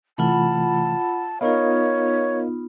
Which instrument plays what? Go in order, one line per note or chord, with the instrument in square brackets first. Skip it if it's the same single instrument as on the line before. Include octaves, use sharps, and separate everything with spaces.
[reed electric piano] C3 E3 A3 [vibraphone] F4 F#5 B5 [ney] A5
[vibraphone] B3 D#4 F4 [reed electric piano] A#4 D#5 F5 [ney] C#5